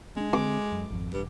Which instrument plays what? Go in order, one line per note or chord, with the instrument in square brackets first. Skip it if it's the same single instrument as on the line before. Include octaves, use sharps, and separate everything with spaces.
[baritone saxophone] G#3 [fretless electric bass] C4 D4
[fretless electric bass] D3 C4 [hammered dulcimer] D6
[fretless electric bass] F#2
G#1 F2
[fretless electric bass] E1 [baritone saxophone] G2